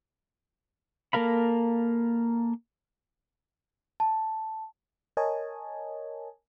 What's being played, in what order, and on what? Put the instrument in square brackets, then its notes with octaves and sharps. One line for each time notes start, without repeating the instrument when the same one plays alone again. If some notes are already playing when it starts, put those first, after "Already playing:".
[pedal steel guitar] A#3 A4 A#4 F5 B5
[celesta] A5
[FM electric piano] A#4 C#5 D#5 G#5 A5